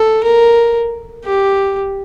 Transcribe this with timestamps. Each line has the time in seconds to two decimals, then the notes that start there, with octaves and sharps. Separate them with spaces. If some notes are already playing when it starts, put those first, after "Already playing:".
Already playing: A4
0.23 A#4
1.25 G4